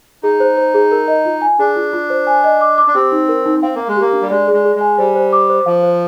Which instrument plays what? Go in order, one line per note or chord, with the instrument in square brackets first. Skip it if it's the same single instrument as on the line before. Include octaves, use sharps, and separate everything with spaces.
[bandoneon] D#4 [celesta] G#4
[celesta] C5
C5
G#4
A#4
D#5
F4
G#5
[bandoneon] D4 [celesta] G#4
[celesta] F4
F4
C5
G#5
D#5
D6
D6
[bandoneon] D4
[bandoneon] C4 [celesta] G4
[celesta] D#4
A#4
D#4
[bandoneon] C4 [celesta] F5
[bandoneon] A#3 [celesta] F5
[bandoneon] G#3
[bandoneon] A#3 [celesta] G4
[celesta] D4
[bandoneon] G3
[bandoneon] G#3 [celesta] D5
[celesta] G#4
[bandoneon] G#3
[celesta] G#4
[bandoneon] G#3
[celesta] G#5
[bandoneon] G3 [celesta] C5
[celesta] C5
D6
C5
[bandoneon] F3 [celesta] F5
[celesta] C5